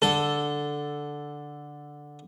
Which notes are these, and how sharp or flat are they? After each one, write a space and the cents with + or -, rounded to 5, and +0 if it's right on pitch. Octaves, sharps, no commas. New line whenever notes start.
D3 +0 A4 +0 A5 +0